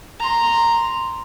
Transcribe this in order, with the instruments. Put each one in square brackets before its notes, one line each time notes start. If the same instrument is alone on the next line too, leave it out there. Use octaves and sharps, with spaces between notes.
[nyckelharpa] A#5 C6